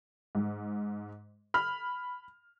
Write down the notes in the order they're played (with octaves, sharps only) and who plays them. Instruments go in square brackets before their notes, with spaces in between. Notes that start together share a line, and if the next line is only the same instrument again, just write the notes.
[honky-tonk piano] G#2
B5 F6